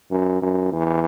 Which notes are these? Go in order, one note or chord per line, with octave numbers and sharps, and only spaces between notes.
F#2
F#2
E2